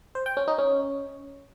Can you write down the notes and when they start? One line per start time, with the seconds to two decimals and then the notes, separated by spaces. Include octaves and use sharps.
0.15 C5
0.26 G5
0.37 C#4
0.48 D#4
0.58 C#4